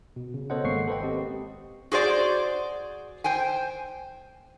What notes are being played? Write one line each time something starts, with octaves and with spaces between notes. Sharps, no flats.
B2
C#3
B3 A4 C5 C#5 D#5 F#5
G#1 G#3 A#3 F#5 C#6 C7
A4 B4 C5 D#5 G5
C4 G4 D#5
F#4 G#4 C5 D5 F#5
C5 G5 G#5